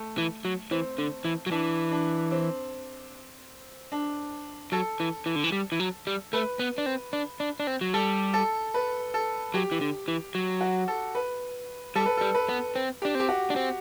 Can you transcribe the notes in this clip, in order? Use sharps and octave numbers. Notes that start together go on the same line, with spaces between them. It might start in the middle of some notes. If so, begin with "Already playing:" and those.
Already playing: A3
E3
F#3
E3 C4
D3
E3
F#3
E3 D4
D4
C4
D4
F#3 A4
E3
E3
D3
E3
G3
E3
F#3
G3
A3 B4
B3
D4
C4
D4
D4
D4
C4
F#3
G3 A4
A4
B4
A4
F#3 G4
E3
D3
E3
F#3
F#4
A4
B4
G3 A4
B4
G3 A4
B4
B3
C4
D4 G4
C4 G4
F#4
D4
C4